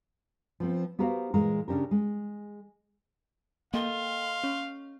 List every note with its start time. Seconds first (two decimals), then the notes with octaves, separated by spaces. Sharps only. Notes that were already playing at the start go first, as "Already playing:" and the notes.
0.60 F3 B3 C4
0.99 B3 F#4 G4 A#4 C5 F5
1.34 A#2 E3 G#3 A#4
1.68 C#3 C#4 D4 G4 A#4
1.91 G#3
3.74 A#3 A4 D#5 F5 G5 C6
4.44 C#4